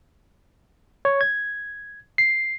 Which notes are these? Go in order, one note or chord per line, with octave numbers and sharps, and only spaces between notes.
C#5
G#6
C7